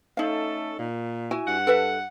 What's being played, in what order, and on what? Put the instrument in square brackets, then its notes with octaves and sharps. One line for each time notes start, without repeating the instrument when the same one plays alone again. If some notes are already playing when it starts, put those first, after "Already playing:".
[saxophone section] A3 C#4 A4 [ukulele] D#4 F5
[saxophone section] A#2
[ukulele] E4 F#4 G#5
[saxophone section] G2 F#5
[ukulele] A4 B4 E5